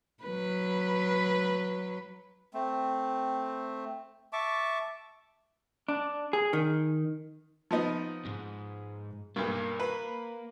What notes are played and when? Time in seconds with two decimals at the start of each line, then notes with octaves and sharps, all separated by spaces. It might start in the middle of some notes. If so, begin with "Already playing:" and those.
0.24 F#3 B4
2.53 A3 C4
4.33 E5 A5 C#6 D6
5.88 D4
6.33 G#4
6.53 D#3
7.71 F3 B3 D#4
8.25 E2 G#2
9.36 B1 G2 A#3
9.80 B4